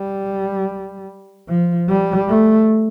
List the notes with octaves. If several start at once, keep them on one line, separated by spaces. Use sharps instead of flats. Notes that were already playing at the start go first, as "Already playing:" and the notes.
Already playing: G3
F3
G3
A3